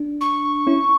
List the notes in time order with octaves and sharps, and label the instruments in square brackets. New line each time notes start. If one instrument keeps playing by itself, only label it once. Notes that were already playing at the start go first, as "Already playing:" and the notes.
Already playing: [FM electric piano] D4
[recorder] C#6
[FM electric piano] C#4 E4